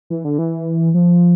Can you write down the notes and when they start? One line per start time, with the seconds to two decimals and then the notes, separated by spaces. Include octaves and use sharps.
0.10 E3
0.24 D3
0.39 E3
0.94 F3